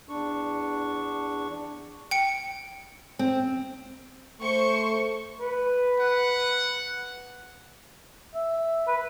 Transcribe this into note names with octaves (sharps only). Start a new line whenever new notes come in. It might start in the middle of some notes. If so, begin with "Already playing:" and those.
E2 D4 C#6
G5 C#7
C4
A3 C5 C#6
B4
F#5
E5
B4